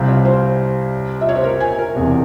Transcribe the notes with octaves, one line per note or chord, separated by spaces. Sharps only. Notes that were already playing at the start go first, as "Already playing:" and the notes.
Already playing: C2 C3 G3 C4 F5
C#5
C5
E5
C#5
C5
A#4
G#5
A#4
E1 E2 C3